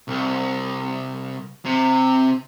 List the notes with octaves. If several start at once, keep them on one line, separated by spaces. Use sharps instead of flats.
C2
C3